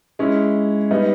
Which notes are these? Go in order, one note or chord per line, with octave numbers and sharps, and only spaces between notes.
G#3 C#4 E4
G3 B3 D#4